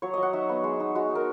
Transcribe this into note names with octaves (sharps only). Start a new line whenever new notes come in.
F#3 C#5
F#3 D#5
F#5
D#4 E5
B3
G#3
D#4
G#3 F#4
D#4
A#4